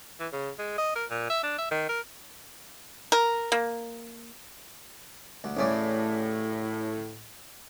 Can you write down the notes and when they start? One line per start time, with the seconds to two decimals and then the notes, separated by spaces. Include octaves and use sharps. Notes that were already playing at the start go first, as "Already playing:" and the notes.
0.20 E3
0.33 C#3
0.59 G#3
0.78 D#5
0.96 A#4
1.10 A#2
1.30 E5
1.43 D4
1.58 E5
1.71 D#3
1.89 A#4
3.12 A#4
3.52 A#3
5.44 D2
5.57 A1 A2 C#3 D5